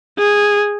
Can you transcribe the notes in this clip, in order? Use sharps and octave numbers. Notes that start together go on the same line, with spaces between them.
G#4